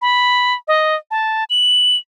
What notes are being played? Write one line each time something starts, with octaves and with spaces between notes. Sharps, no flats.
B5
D#5
A5
F#7